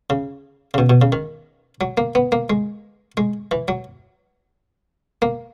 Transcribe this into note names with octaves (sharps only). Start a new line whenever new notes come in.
C#3
C#3
B2
B2
C#3
D#3
F#3
A#3
B3
A#3
G#3
G#3
E3
F#3
A#3